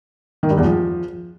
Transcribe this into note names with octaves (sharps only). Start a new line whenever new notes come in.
D#3
G2
E2
F3